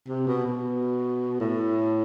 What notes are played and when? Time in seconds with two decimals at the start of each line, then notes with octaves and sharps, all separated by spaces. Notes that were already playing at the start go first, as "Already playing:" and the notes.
0.08 C3
0.27 B2
0.47 B2
1.40 A2